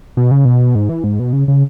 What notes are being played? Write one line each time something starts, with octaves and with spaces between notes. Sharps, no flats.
B2
C#3
B2
G#2
E3
G#2
B2
C#3
C#3